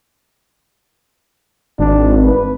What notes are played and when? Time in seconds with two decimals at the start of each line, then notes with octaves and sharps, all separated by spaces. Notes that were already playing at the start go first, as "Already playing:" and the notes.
1.79 G#1 D4
2.24 B4